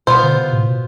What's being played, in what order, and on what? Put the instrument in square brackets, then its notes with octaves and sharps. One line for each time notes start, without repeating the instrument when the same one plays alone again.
[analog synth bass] B2 [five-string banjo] B3 F4 C5
[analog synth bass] D3
C3
A2
B2